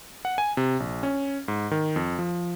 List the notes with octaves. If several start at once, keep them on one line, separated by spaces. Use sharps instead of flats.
F#5
G#5
C3
A#1
C#4
G#2
D#3
F2
F3